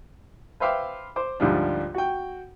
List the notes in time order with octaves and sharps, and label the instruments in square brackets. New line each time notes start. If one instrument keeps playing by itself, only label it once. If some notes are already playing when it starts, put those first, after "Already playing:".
[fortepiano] B4 C5 E5 F5 G5 D6
C5 D6
D2 G#2 F3 G3 D4
F#4 G5